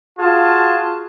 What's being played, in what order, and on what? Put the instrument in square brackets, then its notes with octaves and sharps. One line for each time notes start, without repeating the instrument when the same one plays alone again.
[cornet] F4 [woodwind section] F#4 G#4 A5